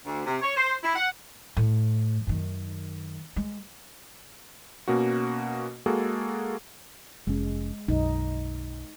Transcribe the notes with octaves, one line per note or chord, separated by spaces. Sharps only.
D2
C3
C#5
C5
E4
F#5
A2
F#2 D#3
G#3
B2 A#3 C#4 F#4
G#3 A#3 F#4 G#4 A4
F1 G#3 C#4
B1 F#2 D#4